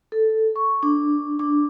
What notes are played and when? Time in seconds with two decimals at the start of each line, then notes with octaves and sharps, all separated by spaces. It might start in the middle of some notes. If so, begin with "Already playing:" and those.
0.12 A4
0.56 C#6
0.83 D4
1.39 D4